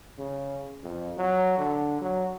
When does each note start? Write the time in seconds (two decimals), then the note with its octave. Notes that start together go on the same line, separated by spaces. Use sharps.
0.18 C#3
0.83 F2
1.17 F#3
1.58 D3
2.01 F#3